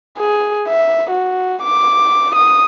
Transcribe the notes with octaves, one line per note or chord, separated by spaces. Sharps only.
G#4
E5
F#4
D6
D#6